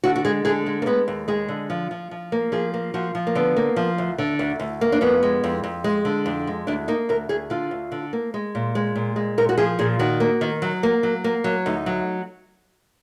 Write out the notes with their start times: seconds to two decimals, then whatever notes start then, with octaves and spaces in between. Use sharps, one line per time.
0.04 D3 F#4
0.16 F#4
0.25 G#3 G#4
0.45 D3 G#4
0.66 G#3
0.82 A#3
0.86 G#3 B3
1.08 D#2
1.28 G#3 G#4
1.48 D3
1.70 F3
1.91 F3
2.11 F3
2.32 A#3
2.52 F3 G#4
2.74 A#3
2.94 F3 F#4
3.15 F3
3.27 A#3
3.35 D3 B3
3.56 A#3
3.76 F3
3.98 D2
4.18 D3
4.39 D2
4.60 D2
4.81 A#3
4.92 D4
5.01 F2 B3
5.23 G#3
5.44 F2
5.63 F2
5.84 G#3
6.05 D3
6.26 F2
6.47 G#3
6.67 D2 D4
6.88 A#3 D#4
7.09 D2 A#4
7.29 D2 G#4
7.50 D3 F4
7.71 D2
7.92 D3
8.13 A#3
8.34 G#3
8.55 A#2
8.75 G#3
8.96 A#2
9.16 G#3
9.38 A#2 A#4
9.49 F#4
9.57 F3 G#4
9.79 A#2 G#4
9.99 D#3 F#4
10.20 A#3
10.41 D#3
10.62 F#3
10.83 A#3
11.03 F#3
11.24 A#3
11.44 F#3
11.66 D2 D#4
11.86 F#3